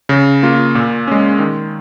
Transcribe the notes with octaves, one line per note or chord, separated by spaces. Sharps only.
C#3
A#3 F4
A#2
G#3 C#4
D#3